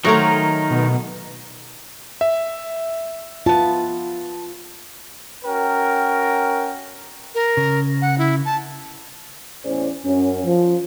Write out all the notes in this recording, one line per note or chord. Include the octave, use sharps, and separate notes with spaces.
D#3 F#3 A3 D#4 A#4 C5 C#5
B2
E5
B3 F4 A5
C#4 F#4 A#4 G5
A#4
C#3
F#5
E4
A5
E2 A2 C#4 G#4 C5 D5
F#2 C#4
F3